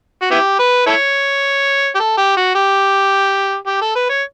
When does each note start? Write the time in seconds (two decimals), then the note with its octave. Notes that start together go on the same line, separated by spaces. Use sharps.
0.22 F#4
0.31 B3 E4 G4
0.59 B4
0.87 E4 A4 C#5
1.95 G4
2.00 A4
2.18 G4
2.37 F#4
2.55 G4
3.66 G4
3.81 A4
3.95 B4
4.09 C#5